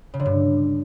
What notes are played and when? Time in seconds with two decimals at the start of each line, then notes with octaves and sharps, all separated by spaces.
0.14 C#3
0.20 D3
0.26 G2